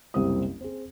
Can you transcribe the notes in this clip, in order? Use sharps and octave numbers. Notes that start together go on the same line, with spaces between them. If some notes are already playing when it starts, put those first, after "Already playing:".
F#1 C2 G3 C4 E4 D#6
C4 G#4